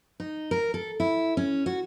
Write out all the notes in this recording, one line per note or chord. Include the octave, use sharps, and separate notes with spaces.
D#4
A#4
A4
E4
C#4
F#4